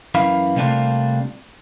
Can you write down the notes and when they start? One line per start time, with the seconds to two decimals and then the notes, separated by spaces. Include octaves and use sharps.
0.15 F#2 E3 A#4 F5 B5
0.56 C3 G3 A3 A#3 D4 F4